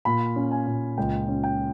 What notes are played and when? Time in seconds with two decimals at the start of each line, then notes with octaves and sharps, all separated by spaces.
0.05 A#2 B5
0.36 C#4
0.51 G#5
0.67 A#2
0.97 C#2 G5
1.28 C#4
1.44 G5